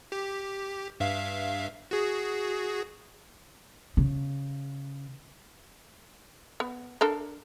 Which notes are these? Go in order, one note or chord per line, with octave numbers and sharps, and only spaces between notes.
G4
G2 E5 F5
F#4 G#4
C#3
B3
D4 A4 A#4